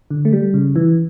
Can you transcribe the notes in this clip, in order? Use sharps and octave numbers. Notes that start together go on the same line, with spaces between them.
D3
A3
G3
C#3
E3